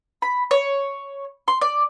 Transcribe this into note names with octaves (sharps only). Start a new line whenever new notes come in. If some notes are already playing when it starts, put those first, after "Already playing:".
B5
C#5
C6
D5